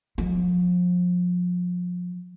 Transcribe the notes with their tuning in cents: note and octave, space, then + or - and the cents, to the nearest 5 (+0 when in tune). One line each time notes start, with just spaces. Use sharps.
F3 +35 G#3 +0